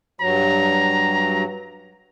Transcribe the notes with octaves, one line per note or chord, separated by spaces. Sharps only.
G2 F#3 A#5